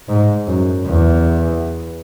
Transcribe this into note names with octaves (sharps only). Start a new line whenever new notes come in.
G#2
F#2
E2